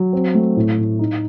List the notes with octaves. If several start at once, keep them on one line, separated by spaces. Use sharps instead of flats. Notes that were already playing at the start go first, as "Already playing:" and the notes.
Already playing: F#3
C4
A3
A2
A2
D#4